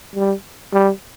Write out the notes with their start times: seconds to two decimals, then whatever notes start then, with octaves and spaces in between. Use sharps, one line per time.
0.16 G3
0.73 G3